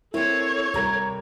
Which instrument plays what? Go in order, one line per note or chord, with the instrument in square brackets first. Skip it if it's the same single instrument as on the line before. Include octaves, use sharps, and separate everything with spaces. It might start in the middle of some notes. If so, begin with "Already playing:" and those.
[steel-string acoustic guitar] A#3 C4 [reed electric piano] E4 [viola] A4 C#5
[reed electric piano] C2 A#5 G#6 [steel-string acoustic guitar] C3 G3 A#3